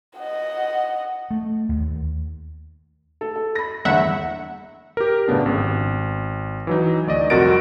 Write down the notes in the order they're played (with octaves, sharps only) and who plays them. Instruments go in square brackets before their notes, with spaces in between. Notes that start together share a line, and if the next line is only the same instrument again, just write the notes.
[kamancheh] D#5 F#5
[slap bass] A3
D#2
[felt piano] A4
A4
B5 A#6
[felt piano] G1 E2 [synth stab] E5 F#5
[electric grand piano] G4 A#4
F#2 A2 C#3 B3 D4
G#1
E3 F#3 D#4
D2 D5 D#5
C2 F2 F#4 A#4 A6 D7